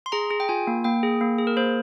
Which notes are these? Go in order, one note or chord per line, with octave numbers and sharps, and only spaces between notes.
C6
G#4 A#5
G#4
G5
F4 G#5
A#3
A#3 G5
G#4
A#3
G#4
A#4
A#3 C5